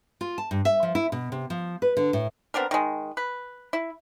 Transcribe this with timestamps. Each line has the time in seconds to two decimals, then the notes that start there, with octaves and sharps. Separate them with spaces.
0.21 F4
0.38 A5
0.51 G2
0.65 E5
0.83 F3
0.95 E4
1.12 B2
1.32 C3
1.50 F3
1.82 B4
1.97 D3
2.13 A2
2.54 B3 C4 D4 A#4
2.71 D#3 G#3
3.17 B4
3.73 E4